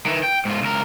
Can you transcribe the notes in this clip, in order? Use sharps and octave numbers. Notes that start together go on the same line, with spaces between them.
D#3 E3
G5
G#2 F4
C#2 A#4